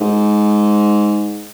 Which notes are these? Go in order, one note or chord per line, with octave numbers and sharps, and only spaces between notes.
G#2